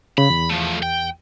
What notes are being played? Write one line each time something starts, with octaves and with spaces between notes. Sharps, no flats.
C#3 B5
E2
F3 A3
G5